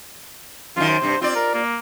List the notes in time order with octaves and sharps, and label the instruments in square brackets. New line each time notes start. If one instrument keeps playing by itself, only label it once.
[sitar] F#2 D#3 [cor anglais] F4
[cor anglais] C5
[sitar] G2 C3
[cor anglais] C4 [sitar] F4 D5
[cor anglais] A#4
A#3